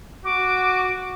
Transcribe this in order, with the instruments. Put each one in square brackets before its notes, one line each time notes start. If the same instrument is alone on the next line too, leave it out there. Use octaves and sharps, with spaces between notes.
[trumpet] F#4 [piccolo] D6